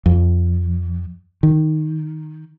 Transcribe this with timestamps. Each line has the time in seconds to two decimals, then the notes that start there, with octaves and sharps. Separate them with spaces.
0.06 F2
1.43 D#3